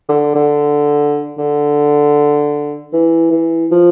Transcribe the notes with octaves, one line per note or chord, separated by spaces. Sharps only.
D3
D3
D3
E3
E3
F3